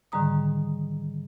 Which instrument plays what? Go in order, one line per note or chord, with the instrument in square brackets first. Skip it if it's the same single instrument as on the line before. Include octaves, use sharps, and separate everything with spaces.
[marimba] G#2 D3 D#3 G3 A#5 D#6